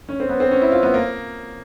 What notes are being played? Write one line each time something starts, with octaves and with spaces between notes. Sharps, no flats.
C#4
C4
B3
C4
C#4
E4
F4
B3
A#3